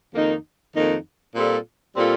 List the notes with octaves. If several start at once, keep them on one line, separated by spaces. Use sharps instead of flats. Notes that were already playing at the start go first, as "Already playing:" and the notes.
F2 D#3 A#3 D#4
F2 D#3 A#3 D#4
A#2 G3 C4 F4 A4
A#2 G3 C4 F4 A4